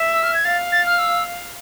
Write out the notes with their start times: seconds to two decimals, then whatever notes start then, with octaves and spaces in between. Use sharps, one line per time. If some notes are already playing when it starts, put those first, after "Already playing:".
Already playing: E5
0.13 E6
0.23 F6
0.34 G#6
0.45 F5 A6
0.72 A6
0.86 F6
0.99 E6